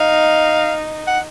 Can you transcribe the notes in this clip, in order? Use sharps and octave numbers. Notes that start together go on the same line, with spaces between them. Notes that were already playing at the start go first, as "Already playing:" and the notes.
Already playing: D#4 F5
F#5